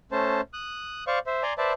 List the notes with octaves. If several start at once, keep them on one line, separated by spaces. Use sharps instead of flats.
A3 C#4 C5 A5
D#6 F#6
C5 D5 F5 C#6
C5 E5
D5 G#5 A#5 C6
B4 C5 D5 E5 A5